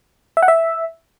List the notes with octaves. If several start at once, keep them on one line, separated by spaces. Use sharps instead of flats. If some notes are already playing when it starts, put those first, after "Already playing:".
E5
F#5
E5